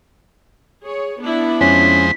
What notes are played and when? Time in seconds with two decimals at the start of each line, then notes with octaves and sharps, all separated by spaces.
0.83 G#4 C#5
1.21 B3 D4 E4
1.61 F2 G#3 C#4 C5 B6